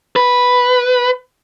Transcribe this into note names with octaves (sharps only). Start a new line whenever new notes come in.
B4